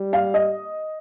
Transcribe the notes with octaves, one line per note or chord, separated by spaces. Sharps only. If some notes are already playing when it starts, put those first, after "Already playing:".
Already playing: G3
F5
D#5